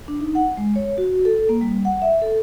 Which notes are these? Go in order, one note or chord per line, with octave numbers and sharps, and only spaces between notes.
D4
D#4
F#5
G#3
C#5
F#4
A4
A#3
G3
F#5
E5
A4